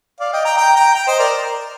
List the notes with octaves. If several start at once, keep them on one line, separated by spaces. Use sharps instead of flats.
D5 F5
D#5 G5
G5 A#5
G5 A#5
G5 A#5
G5 A#5
C5 D#5
A#4 D5